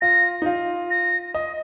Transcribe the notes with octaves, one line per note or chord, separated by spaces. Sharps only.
F4 A#6
D#4
F4
A#6
D#5